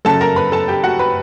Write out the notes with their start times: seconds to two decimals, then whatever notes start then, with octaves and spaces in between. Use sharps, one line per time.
0.05 F#2 C#3 F#3 A4 A5
0.21 A#4 A#5
0.36 B4 B5
0.52 A4 A5
0.68 G4 G5
0.84 F#4 F#5
0.99 B4 B5